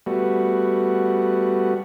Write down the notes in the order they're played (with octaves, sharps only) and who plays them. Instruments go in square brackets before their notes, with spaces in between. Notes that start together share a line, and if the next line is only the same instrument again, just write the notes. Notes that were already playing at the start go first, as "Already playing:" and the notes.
[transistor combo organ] G3 A3 B3 F#4